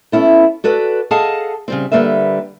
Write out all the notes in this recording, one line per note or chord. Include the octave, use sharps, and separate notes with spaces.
B3 C#4 E4 A4
F#4 A4 B4 D5 F#5
G#4 A4 D#5 F5 F#5 A5
C#3 G3 C4
D3 G3 A#3 B4 E5